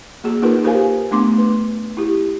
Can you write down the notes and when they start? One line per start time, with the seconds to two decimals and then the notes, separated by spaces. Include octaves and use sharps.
0.24 A#3 F#4 G#4
0.42 A#3 D#4 F4 A#4 B4
0.64 G4 A#4 C5 F5 G#5
1.11 A3 B3 D4 C6 D6
1.38 B4
1.97 E4 G4